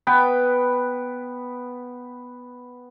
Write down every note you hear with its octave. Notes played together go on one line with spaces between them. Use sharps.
B3 B4 G5